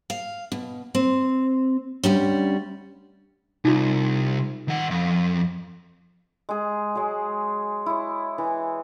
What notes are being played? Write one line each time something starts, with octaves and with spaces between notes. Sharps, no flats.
F5
B2
C4
D2 G3 C#4
C2 D#4 F4
D#3 F#5
F2
G#3 G#4
F#3 G#3
E4 C#5
E3